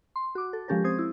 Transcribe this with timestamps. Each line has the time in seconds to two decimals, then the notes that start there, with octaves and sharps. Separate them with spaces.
0.16 C6
0.35 F#4 D6
0.53 A4
0.68 F3 G#3 C#4 G4 A4 A#4
0.84 C4 C5 D#6 G#6
0.99 E4